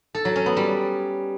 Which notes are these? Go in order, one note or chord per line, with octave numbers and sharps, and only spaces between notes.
A4
F#3
C#4
B3
G3